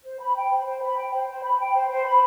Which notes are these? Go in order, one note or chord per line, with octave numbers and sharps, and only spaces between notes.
C5
B5
G5
C5
C5
B5
G5
C5
C5
B5
G5
C5
C5
B5